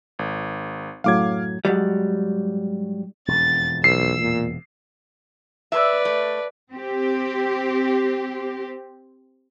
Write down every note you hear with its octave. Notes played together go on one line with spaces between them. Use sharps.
G#1
F#2 A2 F#3 F5 D6 G#6
G#2 F#3 G3
E1 F2 A6
B1 E6 C7
A#2
B4 D5 E5
A3
C4 G4